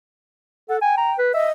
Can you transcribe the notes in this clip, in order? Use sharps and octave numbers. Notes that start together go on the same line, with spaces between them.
A4 F#5
G5 G#5
A#5
B4
D#5 E5